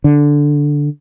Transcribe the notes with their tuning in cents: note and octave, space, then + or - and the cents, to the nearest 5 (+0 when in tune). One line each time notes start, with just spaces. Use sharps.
D3 -5